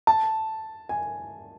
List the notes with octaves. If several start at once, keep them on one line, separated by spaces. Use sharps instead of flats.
A5
G#5